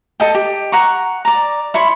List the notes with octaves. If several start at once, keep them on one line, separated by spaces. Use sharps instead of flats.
A4 D#5 G5
G4
F#5 A#5 C#6
D5 A#5
E4 C#5 B5 C6